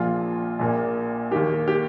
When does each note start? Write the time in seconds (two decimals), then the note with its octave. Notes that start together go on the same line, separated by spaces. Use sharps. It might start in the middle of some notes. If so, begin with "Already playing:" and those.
Already playing: A#1 A#2 F3 F4
0.59 A#1 A#2 A#3
1.31 D#2 D#3 A#3 G4
1.68 G4